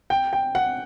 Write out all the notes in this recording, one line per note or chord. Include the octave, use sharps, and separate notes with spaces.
G5
G5
F#5